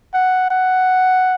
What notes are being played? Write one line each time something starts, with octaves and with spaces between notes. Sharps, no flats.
F#5
F#5